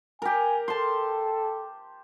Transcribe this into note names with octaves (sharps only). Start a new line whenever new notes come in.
G4 A#4 G#5
A4 A5 C6